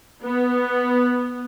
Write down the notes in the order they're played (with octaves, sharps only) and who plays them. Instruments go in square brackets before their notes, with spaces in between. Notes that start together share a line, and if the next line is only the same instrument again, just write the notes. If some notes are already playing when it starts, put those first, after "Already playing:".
[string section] B3